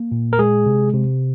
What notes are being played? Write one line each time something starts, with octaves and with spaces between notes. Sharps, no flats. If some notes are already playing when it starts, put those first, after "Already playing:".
Already playing: A#3
A#2
A#4
G#3 G#4
C3
C3